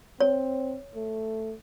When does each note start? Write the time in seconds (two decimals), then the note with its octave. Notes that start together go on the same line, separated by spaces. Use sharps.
0.20 C4 C#5
0.95 A3